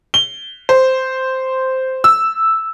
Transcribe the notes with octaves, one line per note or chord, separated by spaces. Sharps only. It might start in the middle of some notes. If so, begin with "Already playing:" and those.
G7
C5
E6